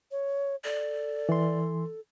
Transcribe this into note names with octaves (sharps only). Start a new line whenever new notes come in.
C#5
A4 D5
E3 C6